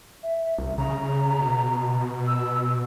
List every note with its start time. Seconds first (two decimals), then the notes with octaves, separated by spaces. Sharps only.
0.23 E5
0.58 C2
0.78 C#3 A#5
1.38 B2
2.27 E6